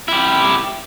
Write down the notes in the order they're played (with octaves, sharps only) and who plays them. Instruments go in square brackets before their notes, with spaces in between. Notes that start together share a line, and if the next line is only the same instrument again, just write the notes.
[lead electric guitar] E4 G4